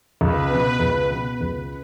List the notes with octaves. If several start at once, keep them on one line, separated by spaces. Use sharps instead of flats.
C#2 B4
B2 B3
C#2
B2 B3
C#2